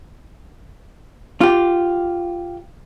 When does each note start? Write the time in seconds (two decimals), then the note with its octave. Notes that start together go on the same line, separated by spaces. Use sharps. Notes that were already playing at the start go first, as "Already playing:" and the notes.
1.41 F4 G4